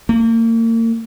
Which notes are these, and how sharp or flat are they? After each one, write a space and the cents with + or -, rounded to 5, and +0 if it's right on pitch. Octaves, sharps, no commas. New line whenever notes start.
A#3 -40